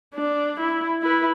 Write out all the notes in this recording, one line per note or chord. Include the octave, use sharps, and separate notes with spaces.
D4
E4
E4 B4